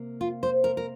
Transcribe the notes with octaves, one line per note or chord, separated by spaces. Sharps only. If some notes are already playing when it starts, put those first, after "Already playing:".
Already playing: C3 A#3
F4
C5
A#4
A#4